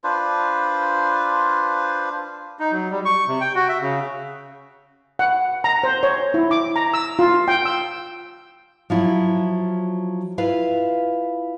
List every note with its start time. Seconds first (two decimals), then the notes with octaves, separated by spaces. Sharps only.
0.04 D4 F4 B4 C5
2.59 D#4
2.72 F#3
2.90 G3
3.05 C#6
3.28 C3
3.41 G5
3.55 F#4
3.69 E5
3.81 C#3
5.19 F#5
5.64 A#5
5.84 C5
6.03 C#5
6.34 E4
6.51 D6
6.76 A#5
6.94 E6
7.19 F4
7.48 G5
7.66 E6
8.90 F3 F#3 E4
10.38 E4 F4 B4 F5